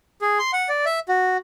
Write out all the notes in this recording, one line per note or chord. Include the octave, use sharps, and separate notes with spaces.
G#4
C6
F#5
D5
E5
F#4